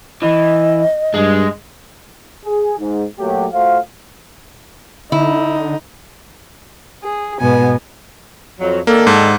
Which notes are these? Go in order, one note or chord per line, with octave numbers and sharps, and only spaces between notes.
E3 D#5
G2 G#3
G#4
G#2
A#2 F#3 A3 G4
A3 F4 F#4 C5 F5
D3 D#4 E4
G#4
G#2 B2 B3 G#5
F2 F#3
D#3 A#3 D4 A4
G#2